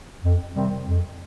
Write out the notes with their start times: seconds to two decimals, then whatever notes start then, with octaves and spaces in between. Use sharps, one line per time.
0.24 F2
0.56 C3 D#3 G3 C4
0.88 F2